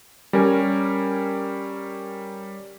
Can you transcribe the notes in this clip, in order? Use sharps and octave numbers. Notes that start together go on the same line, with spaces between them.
G3 C#4 A#4 G#5